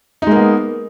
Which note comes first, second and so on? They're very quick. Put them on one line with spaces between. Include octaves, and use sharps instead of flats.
D#4 G#3 A#3 B3